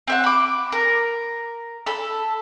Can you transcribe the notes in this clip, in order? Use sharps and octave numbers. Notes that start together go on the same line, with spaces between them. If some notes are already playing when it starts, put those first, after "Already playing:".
C4 E5 F#5
B5 D6
A#4
A4 B5